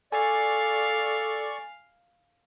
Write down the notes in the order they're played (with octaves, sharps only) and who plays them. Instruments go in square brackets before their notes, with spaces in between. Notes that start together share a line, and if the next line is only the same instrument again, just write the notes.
[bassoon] A4 [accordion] D5 C#6 [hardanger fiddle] F5 [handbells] G#5